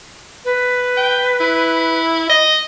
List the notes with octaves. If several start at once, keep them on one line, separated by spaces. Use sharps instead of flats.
B4
G5
E4
D#5